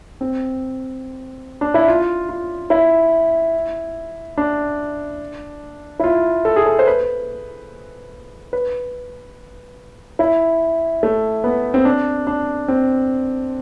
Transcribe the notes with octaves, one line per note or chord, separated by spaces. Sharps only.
C4
D4
E4
F4
F4
E4
D4
E4
F4
A4
G#4
A4
C5
B4
B4
E4
A3
B3
C4
D4
D4
C4